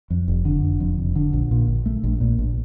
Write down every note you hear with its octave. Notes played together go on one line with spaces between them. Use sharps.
F2
F1
D3
F1
F2
F1
D3
A#1
A#2
A#1
A3
A#1
A#2
A#1